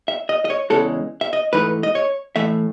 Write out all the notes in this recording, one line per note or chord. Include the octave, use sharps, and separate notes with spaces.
E5
D#5
D#5
C#5
E2 C#3 E3 G#3 A4
E5
D#5
G#2 E3 A3 D#4 B4
D#5
C#5
A2 E3 A3 E5